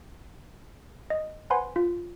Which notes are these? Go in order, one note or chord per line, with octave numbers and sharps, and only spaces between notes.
D#5
B4 C5 F#5 G#5 B5 C6
F4